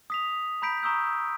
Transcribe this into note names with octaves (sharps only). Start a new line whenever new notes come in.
D#6 B6 F7
A#5 B5 G6 B6 D7
A#5 C#6 D#6 E6 G6